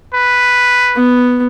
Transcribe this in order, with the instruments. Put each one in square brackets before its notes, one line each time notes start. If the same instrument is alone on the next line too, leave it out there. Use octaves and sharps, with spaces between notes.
[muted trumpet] B4
[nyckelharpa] B3